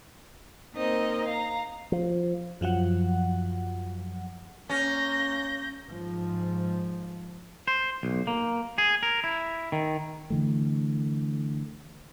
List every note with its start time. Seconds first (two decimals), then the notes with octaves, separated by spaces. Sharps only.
0.74 A#3 C4 D#4 A#4 C5 D#5
1.25 F5 A#5
1.92 F3
2.61 F#2 F3 F#3 F#5
4.69 A#3 C#4 G6 A#6
5.85 G#2 F3
7.68 C5
8.03 B1
8.27 A#3
8.78 G#4
9.03 A#4
9.24 E4
9.72 D#3
10.30 D3 E3 A3